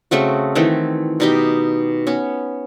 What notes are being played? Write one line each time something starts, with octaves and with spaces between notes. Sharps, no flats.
C#3 A3 C4 F#4
D#3 E3 A3 C4
B2 D#4 G4
B3 C#4